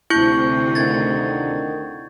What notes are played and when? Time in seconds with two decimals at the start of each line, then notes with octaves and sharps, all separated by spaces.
0.10 D2 C3 E4 C#6 G6 G7
0.75 D3 D#3 G#6 A6